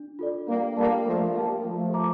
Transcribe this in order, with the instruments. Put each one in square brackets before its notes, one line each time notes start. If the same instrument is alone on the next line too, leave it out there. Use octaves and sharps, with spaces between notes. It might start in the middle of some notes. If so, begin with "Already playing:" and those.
Already playing: [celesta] D4
F4 A4 D5
[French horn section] G3 A#3 [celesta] D4
[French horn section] G3 A#3 [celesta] A4 D5 A5
[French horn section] F3 A3 [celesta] A#4
[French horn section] G3 A#3 [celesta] F5 A5
[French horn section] F3 A3 [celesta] F4
[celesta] C5 E5 A#5 D6